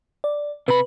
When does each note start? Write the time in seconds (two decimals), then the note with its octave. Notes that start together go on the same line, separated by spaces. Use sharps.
0.24 D5
0.68 C3 B4 B5